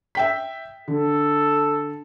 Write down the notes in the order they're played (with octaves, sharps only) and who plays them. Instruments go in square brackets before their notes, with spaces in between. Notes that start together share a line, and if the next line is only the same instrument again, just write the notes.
[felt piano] E5 G5 B6
[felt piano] D3 [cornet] A4